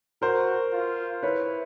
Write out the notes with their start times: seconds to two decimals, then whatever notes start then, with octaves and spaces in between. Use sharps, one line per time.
0.22 F#4 A#4 C5
0.73 F4
1.23 E4 B4 C#5